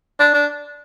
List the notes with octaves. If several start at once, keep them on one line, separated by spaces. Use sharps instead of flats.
D4
D4